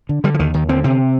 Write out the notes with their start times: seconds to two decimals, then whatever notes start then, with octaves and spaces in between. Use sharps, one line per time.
0.09 D3
0.24 D3 G3
0.34 F3
0.39 D#2 D#3
0.54 D#2 D#3
0.69 D3 C4
0.84 C3 C4